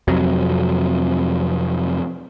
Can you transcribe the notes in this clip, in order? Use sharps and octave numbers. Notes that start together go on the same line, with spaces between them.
F2 C3 F#3